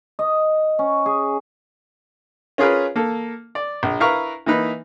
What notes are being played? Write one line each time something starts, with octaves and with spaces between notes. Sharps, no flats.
D#5
C#4
G#4
C#4 F4 G#4 A#4 B4
A#3 A4
D5
A#1
E4 A#4 B4 F5 A#5 C#6
E3 A#3 D#4 B4